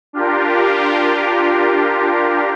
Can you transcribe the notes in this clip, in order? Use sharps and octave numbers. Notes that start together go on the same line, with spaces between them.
D4 F4 G4 A#4